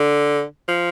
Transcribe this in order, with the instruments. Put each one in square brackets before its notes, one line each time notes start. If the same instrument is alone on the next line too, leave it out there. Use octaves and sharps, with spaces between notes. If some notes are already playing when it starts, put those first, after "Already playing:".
Already playing: [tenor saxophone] D3
F3